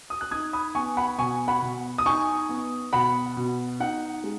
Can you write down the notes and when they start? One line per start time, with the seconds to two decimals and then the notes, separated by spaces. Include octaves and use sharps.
0.10 D#6
0.21 F#6
0.31 D#4 D#6 G#6
0.53 B5 D#6
0.75 B3 G#5 C#6
0.97 F#5 B5
1.19 B2 G#5 C#6
1.48 F#5 B5
1.62 B2
1.98 D#6
2.06 D#4 G#5 C#6
2.49 B3
2.93 B2 F#5 B5
3.37 B2
3.80 D#4 F#5
4.24 G#3